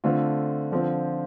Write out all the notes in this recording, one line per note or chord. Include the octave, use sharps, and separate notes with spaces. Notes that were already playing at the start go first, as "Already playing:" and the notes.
D3 A3 C4 F4
D3 F3 C4 F4